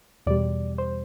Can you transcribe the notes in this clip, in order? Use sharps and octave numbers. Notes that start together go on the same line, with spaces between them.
E2 B2 G3 D5
C5